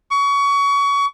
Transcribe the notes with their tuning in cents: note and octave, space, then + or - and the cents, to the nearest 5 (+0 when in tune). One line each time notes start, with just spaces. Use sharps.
C#6 +25